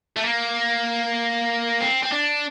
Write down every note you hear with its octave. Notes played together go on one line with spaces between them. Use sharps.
A3
A#3
C4
C4
D4